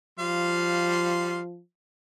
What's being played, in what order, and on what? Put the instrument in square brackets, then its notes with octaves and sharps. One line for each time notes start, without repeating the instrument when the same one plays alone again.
[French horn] F3 [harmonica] G3 F5 C6